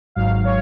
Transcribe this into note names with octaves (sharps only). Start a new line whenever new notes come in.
G#1 G#2 F#3 F5
C#5